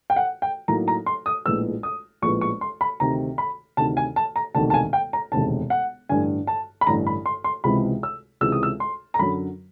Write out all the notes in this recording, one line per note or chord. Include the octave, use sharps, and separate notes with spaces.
G5
F#5
G5
A2 F#3 A#3 D#4 A#5
A#5
C6
D#6
A#1 A2 F3 G#3 B3 E6
D#6
A#1 A2 F3 G#3 B3 C#6
C#6
C6
B5
D2 C3 D#3 A#5
B5
D2 C3 D#3 A5
G#5
A5
A#5
E1 D2 C3 D#3 A5
A5
G#5
G5
A#5
E1 D2 C3 D#3 A5
F#5
A1 G2 D3 G#5
A5
B5
A1 G2 D3 A#5
B5
C6
C6
C#2 C3 E3 G#3 B5
E6
C#2 C3 E3 G#3 E6
D#6
E6
C6
A#5
F#2 D3 F#3 B5